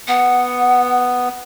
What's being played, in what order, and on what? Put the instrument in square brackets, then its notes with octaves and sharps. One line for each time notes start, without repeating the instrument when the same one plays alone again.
[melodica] B3 [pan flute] F#5